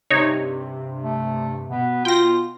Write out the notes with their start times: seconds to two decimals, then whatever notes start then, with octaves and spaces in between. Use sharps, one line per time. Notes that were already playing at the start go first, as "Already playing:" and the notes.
0.10 G2 C3 D#4 C#5
1.04 A3
1.69 B2 B3
2.05 F4 G5 A#6